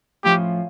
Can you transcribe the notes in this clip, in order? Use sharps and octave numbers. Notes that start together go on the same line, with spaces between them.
A2 F3 C#4 F4 G4